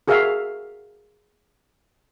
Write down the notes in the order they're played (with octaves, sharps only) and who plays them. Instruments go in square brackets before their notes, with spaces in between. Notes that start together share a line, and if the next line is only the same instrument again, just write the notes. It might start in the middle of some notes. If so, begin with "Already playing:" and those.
[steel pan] F#4 G#4 A#4 E5 F5